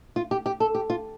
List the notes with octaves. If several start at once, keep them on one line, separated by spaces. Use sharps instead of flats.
F4
G4
G4
A4
G4
F4